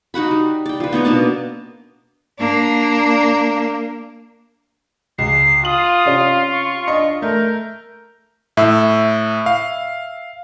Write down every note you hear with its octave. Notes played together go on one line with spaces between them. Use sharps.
D#4 F#4 F#5 B5
G3
D5 G5
F3 B4
B3 D#4 C#5 A#5
B2 A#3 D4 A5
A#3 D4
C#2 C7
F4 D#6 F#7
C3 C#4
C#6
D4 D#5
A3 A#4 G6
A2 E5 E6
F5